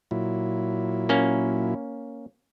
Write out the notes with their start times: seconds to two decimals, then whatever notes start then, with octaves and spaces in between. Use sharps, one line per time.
0.11 A#2 F#3 E4
1.09 A#3 C#4